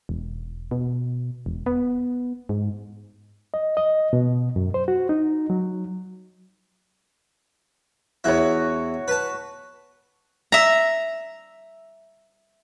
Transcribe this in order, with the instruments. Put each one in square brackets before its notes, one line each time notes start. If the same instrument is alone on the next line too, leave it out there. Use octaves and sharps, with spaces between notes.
[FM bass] E1
B2
E1
B3
G#2
[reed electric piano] D#5
D#5
B2
F#2
C5
F#4
D#4
F#3
[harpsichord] E2 E4 [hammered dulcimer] F#4 C#5
[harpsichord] B4 A5
[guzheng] E5 A#5